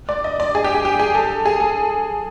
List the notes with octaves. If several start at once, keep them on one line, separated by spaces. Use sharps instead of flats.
D5
D#5
D5
G#4
G4
G#4
G4
G#4
A4
G#4
A4